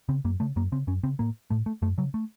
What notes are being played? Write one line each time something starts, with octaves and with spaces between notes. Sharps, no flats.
C#3 C4
F#2 A#3
C#3 A3
F#2 A#3
C#3 C4
F#2 C#4
C#3 C4
A2 A#3
A2 A3
A3
F#2 A3
C#3 F#3
A3